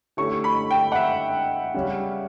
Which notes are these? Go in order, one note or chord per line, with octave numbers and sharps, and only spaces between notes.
D3 A3 C#4 E4 G4 C#6
B5
G5
F#5
E5
C#3 G3 C#4